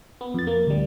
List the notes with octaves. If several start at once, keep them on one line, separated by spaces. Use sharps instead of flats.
B3
F2 A6
A#3
D2 G3